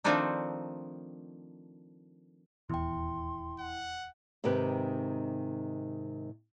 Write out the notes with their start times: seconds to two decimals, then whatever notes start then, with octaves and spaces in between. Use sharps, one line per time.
0.04 D#3 F3 A3 C4 D4 D#4
2.70 D#1 E2 E4 G5 C6
3.59 F#5
4.44 G#2 C3 D#3 G4 B4